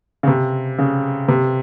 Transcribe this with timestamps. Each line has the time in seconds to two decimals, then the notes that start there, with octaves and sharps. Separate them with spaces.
0.23 C#3
0.27 C3
0.79 C#3
1.28 C3